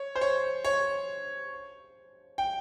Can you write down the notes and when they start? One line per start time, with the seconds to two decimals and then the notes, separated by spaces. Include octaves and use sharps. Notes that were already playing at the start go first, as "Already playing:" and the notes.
Already playing: C#5
0.16 C5
0.21 C#5
0.65 C#5
2.38 G5